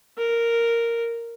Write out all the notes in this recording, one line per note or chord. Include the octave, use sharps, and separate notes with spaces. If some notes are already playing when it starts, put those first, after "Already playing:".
A#4